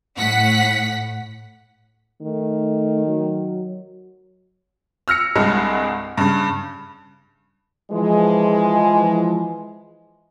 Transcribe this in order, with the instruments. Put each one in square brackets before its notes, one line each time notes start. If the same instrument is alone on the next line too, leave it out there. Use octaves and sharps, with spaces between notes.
[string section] A2 F#5 B6
[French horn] D#3 [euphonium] A3
[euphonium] F#3
[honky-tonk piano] E6 F6 A#6 C#7
C2 G2 G#3
G2 C#3
[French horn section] E3 F3 G#3